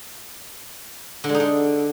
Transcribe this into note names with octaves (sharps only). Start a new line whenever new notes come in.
D3
G#3
D#4
D3